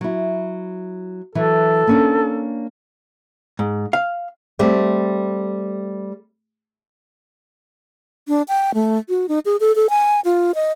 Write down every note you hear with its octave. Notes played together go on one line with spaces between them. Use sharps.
F#3 E4
E3 F#3 A4
A#3 C#4 D4
G#2
F5
G3 A3 C4
D4
G5
A3
F#4
D#4
G#4
A4
A4
G#5
F4
D#5